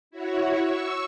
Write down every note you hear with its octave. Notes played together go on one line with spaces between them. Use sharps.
E4 F#4 C#5
C#6 E6